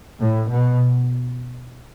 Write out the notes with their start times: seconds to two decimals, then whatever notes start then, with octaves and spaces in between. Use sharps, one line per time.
0.20 A2
0.48 B2